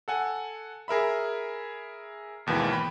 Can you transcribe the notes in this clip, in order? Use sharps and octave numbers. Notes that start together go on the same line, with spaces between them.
A4 F#5 G#5
G#4 A#4 E5 B5
G#1 D#2 B2 E3 G#3
G5 B5